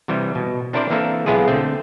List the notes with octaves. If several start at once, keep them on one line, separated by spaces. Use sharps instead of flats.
C3 E3 G3
B2
C4 D4 E4 A#4 C5 D5
E3 A#3 C4 D4 A4 E5
B1 G#3 B3 E4 F4 G#4
D3 A3 C4